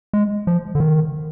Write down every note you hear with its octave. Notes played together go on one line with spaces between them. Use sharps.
G#3
F3
D3
D#3